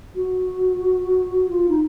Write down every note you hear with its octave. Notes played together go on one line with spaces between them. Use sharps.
F#4
F4
D#4